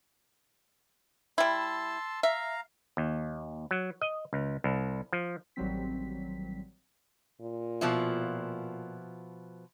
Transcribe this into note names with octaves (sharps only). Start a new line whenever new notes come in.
G3 E4 A5 C6 E6
E5 F5 A#5
D#2
F#3
D#5
C#2
C2
F3
A1 D#3 F#3 G3 C4 B6
A#2
B2 F3 E4